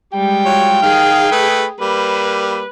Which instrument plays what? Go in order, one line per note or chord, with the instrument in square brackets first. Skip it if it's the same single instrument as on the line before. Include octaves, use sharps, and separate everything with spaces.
[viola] G3 G#3 [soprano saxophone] G5
[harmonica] F#3 F4 C#5
[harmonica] D#3 F5 F6 [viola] G#4
[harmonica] A3 B4
[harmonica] G3 A#3 [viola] B4